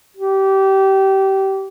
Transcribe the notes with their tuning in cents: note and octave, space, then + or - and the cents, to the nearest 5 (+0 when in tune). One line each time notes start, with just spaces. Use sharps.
G4 -25